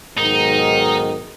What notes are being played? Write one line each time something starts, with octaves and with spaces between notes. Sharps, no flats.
B1 G#2 D#3 D#4